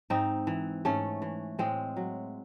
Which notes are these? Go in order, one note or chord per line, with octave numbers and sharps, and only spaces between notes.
G#2 C4 D#4
E3
G#2 A3 C#4
E3
A2 G#3 C4
F#3